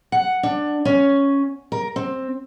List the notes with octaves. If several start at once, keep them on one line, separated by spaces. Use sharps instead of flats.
F#5
D4
C#4
A#4
C4